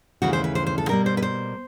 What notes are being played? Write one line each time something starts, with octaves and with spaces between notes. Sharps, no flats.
D#2 C#3 E3 A3 F#4
C5
B4
C5
C5
A4
B2 G3 A#3 A#4
C5
B4
C5